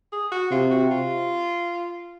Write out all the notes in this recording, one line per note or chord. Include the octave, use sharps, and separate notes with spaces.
G#4
F#4
C3 F4
F#4
F4